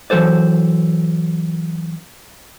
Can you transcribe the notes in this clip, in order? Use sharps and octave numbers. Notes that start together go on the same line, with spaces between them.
E3 F#3 A4 C5 D5